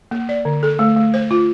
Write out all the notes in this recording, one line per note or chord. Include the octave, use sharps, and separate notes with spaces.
A#3
D5
D3
A4
A3
A3
C5
F4